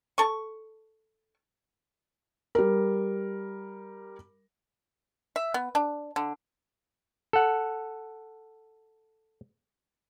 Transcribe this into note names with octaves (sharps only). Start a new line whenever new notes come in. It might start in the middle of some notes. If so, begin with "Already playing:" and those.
A4 C#6
G3 A#4
E5
B3
D4
D3
A4 F#5